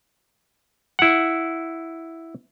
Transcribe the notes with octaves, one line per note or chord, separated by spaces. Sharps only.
E4 F#5